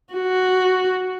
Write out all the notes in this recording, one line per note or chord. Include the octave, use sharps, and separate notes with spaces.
F#4